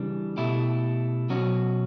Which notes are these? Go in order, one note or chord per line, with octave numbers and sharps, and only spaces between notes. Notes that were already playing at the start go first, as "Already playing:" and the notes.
Already playing: C#3 E3 G3 D4
B2 A3 E4 G4
B2 F#3 C#4 F#4